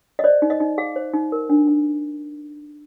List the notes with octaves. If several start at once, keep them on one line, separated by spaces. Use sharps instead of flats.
D#5
C5 D5
D#4
D#5
D#4
G#4 F5
C5
D#4
A#4
D4
D4